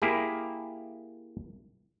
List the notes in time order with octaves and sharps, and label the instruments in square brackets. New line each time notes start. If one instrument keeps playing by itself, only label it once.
[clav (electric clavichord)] A#3 E4 G4 G#4